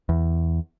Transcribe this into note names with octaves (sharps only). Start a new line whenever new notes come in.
E2